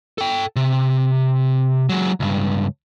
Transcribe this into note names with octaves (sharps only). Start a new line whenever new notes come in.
A4 G5
C3
F#3 G#3
C#2 G2